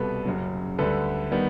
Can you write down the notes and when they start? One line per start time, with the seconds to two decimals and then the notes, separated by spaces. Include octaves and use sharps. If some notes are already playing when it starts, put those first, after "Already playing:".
Already playing: C2 B2 G3 B3 A4 B4
0.25 F#1 F#2 C#3 F#3
0.78 D2 D3 G3 A4 B4
1.32 D#3 G3 B3